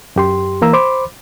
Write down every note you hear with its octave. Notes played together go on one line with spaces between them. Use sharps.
F#2 G4 C6
E3 A#3 A#5 E6
C5 B5 C6 D6